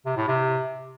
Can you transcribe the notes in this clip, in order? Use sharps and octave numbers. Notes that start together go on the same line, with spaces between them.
C3
A2
C3